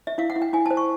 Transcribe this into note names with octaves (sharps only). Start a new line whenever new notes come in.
E5
E4 F5
F#5
E4
G5
E4 G#5
C5 A5
C#6